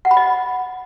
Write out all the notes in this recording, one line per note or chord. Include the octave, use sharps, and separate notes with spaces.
F#5
B5
D#5